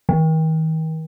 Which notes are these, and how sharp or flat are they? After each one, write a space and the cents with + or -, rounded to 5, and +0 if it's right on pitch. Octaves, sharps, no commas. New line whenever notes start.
D#3 +40